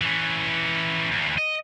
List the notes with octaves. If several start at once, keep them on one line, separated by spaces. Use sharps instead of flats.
E3 C#4
D2 E3
D#5